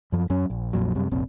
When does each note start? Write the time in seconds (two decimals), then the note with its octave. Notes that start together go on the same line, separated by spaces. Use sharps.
0.12 F#2 F3
0.30 F#2 F#3 C#4
0.50 A#1
0.73 A#1 F2 A#2 F#3
0.95 F#2 C3 G3
1.11 F1 A#1 C4